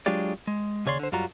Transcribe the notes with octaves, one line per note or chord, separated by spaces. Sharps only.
F#3 G#3 D4 F4 G4 D5
G#3
D#2 C#3 C#5 D5 C6
D3 C5
F#2 G3 F4 F#4 A#5